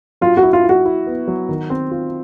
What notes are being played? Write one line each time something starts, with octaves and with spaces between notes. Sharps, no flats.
F#3 F4
F#4
E4
F4
E4
F#4
E4
B3
F#3
D#3
C4
F4